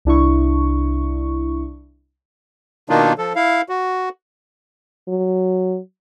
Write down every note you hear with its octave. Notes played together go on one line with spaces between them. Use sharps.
C2 D4 E4 C#6
B2 D#3 A#3 D4 D#4 F4
F3 A4
E4 F5
F#4
F#3